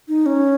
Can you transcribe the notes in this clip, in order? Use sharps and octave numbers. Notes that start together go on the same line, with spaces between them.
D#4
C#4